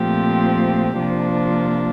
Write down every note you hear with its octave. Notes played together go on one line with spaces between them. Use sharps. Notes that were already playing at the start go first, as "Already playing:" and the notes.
Already playing: A#2 F3 A3 C4 G4
C3 F3 A#3 D4